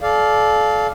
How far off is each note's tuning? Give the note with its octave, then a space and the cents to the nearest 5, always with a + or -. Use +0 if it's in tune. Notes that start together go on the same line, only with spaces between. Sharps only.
A4 -35 D5 +0 F5 +0